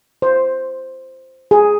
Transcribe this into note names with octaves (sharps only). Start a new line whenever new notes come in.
C5
G#4